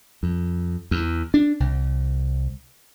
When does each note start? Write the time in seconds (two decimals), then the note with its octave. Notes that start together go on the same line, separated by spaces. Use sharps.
0.23 F2
0.91 E2
1.34 D4
1.60 C2